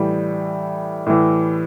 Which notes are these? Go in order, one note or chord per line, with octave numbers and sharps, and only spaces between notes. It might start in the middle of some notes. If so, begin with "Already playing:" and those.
Already playing: A2 E3 G3
A2 E3